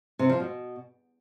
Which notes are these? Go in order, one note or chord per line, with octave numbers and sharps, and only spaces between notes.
C3
F3
B2